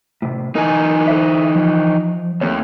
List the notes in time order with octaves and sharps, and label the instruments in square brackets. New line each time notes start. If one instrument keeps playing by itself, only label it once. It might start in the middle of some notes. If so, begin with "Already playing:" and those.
[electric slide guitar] A2 C3
[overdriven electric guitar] E3 D#4 [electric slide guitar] A#4 G#5
[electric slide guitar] A4 C5 E5
F3
[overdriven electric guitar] D#2 [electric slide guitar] A3 C4 C#5